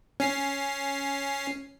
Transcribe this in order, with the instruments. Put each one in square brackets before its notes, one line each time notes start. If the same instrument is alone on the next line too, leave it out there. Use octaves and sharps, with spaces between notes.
[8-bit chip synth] C#4 C7